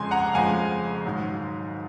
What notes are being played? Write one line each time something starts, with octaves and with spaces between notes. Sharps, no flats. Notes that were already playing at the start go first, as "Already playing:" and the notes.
Already playing: F2 C#3 G#3 G#5 C6
F#5 A#5
F#5
F2 C#3 F3 G#3 F5 G#5
G#2 D#3 F#3